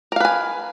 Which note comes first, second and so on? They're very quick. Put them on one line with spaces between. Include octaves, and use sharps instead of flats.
A#4 F5 B4 G#5